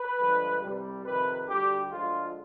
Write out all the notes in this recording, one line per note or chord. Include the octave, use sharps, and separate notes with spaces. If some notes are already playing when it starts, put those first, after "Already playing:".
Already playing: B4
G2 D3 F3 G#3
C2 C3 G3
F2 C3 D#3 B4
D2 D3 G3 G4
D2 D3 F3 G#3 F4